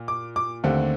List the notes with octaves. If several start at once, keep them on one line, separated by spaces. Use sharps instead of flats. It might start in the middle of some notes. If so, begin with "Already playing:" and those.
Already playing: A#2
D6
D6
D#2 D3 A3 C4